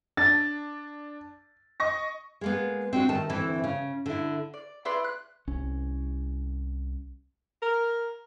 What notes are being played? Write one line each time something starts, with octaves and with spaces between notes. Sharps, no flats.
D4 A6
D#5 C#6 A#6
G#3 A#3 B3
C4 D4 F#4
D#3 A3 A5
D2 E3 C4 E4
C#3
D3 E4
D5
E4 B4 D5 C6
F#6
C2 C#4
A#4